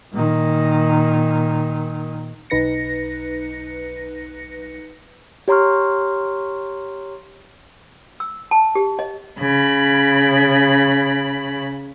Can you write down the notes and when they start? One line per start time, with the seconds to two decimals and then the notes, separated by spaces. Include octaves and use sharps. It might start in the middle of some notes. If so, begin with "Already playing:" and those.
0.13 A#2 D#3
2.50 B1 D#4 B4 A#6 C#7
5.48 G4 C#5 A#5 C6 C#6 F6
8.20 E6
8.51 A5
8.75 G4
8.99 D#5
9.39 C#3 B5